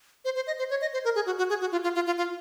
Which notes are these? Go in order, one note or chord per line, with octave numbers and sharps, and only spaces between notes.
C5
C5
D#5
C5
C#5
D#5
C5
A#4
G#4
F#4
F#4
G#4
F#4
F4
F4
F4
F4
F4